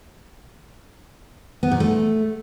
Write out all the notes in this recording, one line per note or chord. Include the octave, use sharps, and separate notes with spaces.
B3
A#2
A3